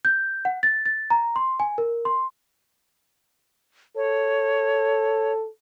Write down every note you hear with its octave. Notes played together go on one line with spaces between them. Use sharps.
G6
F#5
A6
A6
A#5
C6
G#5
A#4
C6
A4 C#5